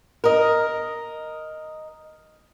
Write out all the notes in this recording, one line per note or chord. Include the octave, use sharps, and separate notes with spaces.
A#4 D#5